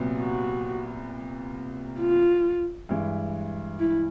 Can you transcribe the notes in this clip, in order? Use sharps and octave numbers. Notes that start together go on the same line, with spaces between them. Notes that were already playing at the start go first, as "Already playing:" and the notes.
Already playing: C2 A#2 F#3 B3
F#4
F4
G2 E3 G#3
E4